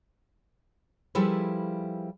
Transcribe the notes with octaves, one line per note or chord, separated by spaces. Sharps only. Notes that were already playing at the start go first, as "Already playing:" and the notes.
F3 G3 E4 G#4 A4 B4